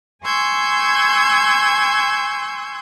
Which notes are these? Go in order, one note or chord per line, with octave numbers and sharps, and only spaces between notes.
G#5 C6 C#6 E6 G6 G#6